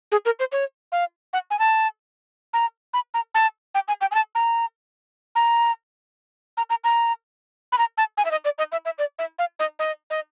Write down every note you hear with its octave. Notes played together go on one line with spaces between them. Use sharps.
G#4
A#4
C5
C#5
F5
F#5
G#5
A5
A#5
B5
A#5
A5
G5
G#5
G5
G#5
A5
A#5
A#5
A#5
A#5
A#5
B5
A#5
A5
G#5
E5
D#5
D5
D#5
E5
E5
D5
E5
F5
D#5
D#5
D#5